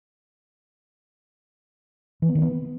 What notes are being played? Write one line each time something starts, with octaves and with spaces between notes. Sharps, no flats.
E3
B3
D#3
B3